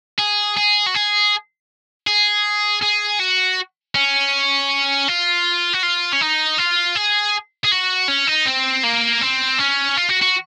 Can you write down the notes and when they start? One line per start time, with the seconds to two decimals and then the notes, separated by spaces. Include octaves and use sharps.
0.18 G#4
0.57 G#4
0.86 F#4
0.95 G#4
2.07 G#4
2.82 G#4
3.20 F#4
3.95 C#4
5.08 F4
5.74 F#4
5.83 F4
6.13 C#4
6.21 D#4
6.58 F4
6.96 G#4
7.65 G#4
7.72 F#4
8.08 C#4
8.27 D#4
8.46 C4
8.84 A#3
9.22 C4
9.59 C#4
9.97 F4
10.09 F#4
10.22 F#4